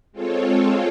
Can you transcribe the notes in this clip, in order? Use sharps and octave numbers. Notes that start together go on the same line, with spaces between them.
G#3 C4 F4 A4 C#5